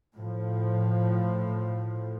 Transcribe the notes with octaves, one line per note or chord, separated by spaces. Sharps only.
A2 F3